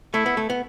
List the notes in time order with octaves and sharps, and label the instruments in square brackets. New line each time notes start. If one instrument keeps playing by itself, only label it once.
[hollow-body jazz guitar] A3 [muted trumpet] E4
[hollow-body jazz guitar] B3
A3
B3